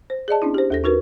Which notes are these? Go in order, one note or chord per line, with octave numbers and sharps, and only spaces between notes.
C5
G#4 D5 D#5 A5
B3 C#4 D4 E4
G4 C5
D#2 A4 A#6
D#4 F#4 A#4 B4